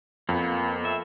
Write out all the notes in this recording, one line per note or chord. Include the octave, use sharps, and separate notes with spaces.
F2 A#3 B3
E5